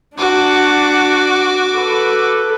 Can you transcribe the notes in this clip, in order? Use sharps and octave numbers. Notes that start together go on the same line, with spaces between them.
D4 F#4 F#5 D6
A4 B4